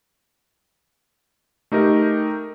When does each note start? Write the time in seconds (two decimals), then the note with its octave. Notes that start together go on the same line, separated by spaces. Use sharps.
1.72 A3 D#4 G4 A#4